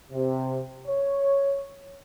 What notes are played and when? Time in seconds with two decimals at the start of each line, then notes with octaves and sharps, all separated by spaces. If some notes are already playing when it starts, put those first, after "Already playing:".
0.11 C3
0.87 C#5